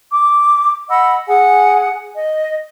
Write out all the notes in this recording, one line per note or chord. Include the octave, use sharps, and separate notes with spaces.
D6
D#5 F#5 B5 E6
G#4 F#5 G#5
D#5